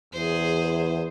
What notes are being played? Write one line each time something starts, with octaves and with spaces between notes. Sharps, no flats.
E2 G#4 C5